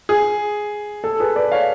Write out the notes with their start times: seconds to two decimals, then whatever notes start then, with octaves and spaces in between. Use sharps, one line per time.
0.09 G#4
1.04 A4
1.20 G#4 B4
1.36 B4 D5
1.52 C#5 F5